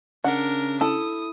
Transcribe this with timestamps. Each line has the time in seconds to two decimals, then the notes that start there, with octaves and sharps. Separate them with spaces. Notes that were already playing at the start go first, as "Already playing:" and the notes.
0.24 C#3 D4 A#4 F#5
0.81 E4 A4 D#6